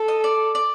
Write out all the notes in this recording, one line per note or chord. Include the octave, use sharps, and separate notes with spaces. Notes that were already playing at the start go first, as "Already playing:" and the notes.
Already playing: A4
D#5
D5
D5